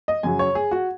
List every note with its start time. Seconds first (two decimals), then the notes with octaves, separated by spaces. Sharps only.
0.08 D#5
0.23 F#2 C#3 F#3 G#5
0.39 C#5
0.55 G#4
0.71 F#4